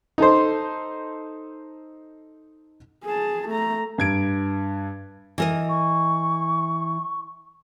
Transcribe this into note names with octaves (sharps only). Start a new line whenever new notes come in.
D#4 A4 C5
G#4 A5
A3 A#5
G2 G#6 D7
E3 A#4 D#5
C#6